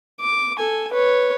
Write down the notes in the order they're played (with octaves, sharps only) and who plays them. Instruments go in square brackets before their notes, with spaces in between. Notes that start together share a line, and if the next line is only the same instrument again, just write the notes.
[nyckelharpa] D6
A4 G#5
B4 C#5